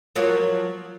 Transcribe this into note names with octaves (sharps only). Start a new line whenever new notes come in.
F3 F#3 A#3